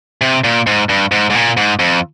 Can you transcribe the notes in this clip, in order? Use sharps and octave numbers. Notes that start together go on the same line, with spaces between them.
C3
A#2
G#2
G2
G#2
G#2
A#2
G#2
F2